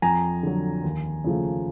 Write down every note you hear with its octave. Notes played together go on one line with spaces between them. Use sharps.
F2 G#5 A#5
D3 F#3
D#2
C#3 F3 A3